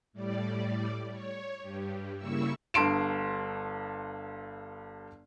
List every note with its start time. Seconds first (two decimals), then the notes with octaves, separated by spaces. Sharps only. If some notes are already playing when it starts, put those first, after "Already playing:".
0.13 A2 G3 D5
1.11 C#5
1.61 G2 G3
2.17 C#3 G3 A#3 E4 C#6 E6
2.74 G1 G2 C6 D7 E7